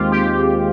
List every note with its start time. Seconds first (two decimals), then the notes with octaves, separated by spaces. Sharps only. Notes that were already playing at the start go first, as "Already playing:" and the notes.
Already playing: D#2 D#3 G#3 C4 F4 G4
0.12 G4